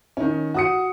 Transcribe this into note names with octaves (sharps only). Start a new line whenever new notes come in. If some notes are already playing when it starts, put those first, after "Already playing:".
D#3 C#4
F#4 D#6 C#7